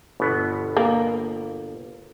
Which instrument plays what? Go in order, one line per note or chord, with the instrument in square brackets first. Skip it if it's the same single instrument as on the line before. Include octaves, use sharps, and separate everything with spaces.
[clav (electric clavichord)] G1 B2 B3
[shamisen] A#3